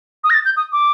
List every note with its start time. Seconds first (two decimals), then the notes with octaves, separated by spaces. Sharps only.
0.24 D#6
0.30 A#6
0.34 A6
0.45 G6
0.57 D#6
0.73 D6